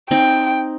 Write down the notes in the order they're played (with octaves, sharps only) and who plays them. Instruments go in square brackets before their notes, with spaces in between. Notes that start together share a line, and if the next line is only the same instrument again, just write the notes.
[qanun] C4 D#4 [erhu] G5